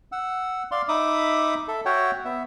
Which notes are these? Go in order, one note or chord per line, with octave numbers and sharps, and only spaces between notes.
F#5 E6
D5 F5 C6
D#4 E5 B5 D6 D#6
A4 E5
F#4 C#5 E5 F#5 G5
B3 E5